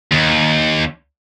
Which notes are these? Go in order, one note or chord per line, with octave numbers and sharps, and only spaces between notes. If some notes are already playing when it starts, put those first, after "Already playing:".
D#2